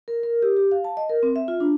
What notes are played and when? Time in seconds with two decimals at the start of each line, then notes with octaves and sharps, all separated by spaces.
0.08 A#4
0.23 A#4
0.42 G4
0.57 G4
0.72 F5
0.84 A5
0.97 D#5
1.10 A#4
1.23 C4
1.36 E5
1.48 F4
1.60 D4